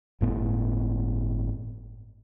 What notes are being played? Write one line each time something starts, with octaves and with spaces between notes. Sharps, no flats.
G1 A2 B3